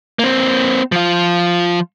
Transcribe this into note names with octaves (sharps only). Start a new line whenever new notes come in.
A#3 C4
F3 F4